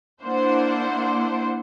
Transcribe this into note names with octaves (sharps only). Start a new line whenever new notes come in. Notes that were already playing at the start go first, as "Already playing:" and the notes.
A#3 D4 E4 C5 F#5